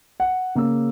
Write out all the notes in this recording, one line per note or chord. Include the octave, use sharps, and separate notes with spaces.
F#5
C#3 A#3 C#4 E6